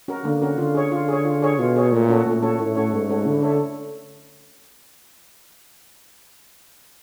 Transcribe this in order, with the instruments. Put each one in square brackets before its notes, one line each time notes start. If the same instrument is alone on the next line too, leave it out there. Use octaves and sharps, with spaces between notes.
[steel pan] C#4 F#4 A#4
[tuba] D3 [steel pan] A#3
[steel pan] C#4 F#4 A#4
[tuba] D3 [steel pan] F4
[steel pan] G#4 C#5
F4
G#4 C#5
F4
G#4 C#5
[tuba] B2 [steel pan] F4
[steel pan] G#4 C#5
[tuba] A#2 [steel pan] A3
[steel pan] C#4 F#4 A4 C#5
[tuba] A#2 [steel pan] A3
[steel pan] C#4 F#4 A4 C#5
[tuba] A2 [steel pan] A3
[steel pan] C#4 F#4 A4 C#5
[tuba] G#2 [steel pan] A3
[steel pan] C#4 F#4 A4 C#5
[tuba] D3 [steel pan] E4
[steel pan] A4 C#5 E5